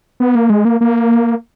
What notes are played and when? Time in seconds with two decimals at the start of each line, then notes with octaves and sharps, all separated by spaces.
0.20 B3
0.35 A#3
0.50 G#3
0.65 A#3
0.81 A#3